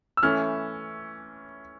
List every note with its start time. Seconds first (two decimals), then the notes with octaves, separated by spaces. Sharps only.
0.17 E6
0.23 E3 A3 C#4 E4 F6